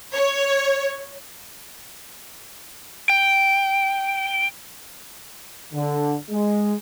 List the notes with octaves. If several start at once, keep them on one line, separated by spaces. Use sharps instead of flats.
C#5
G5
D3
G#3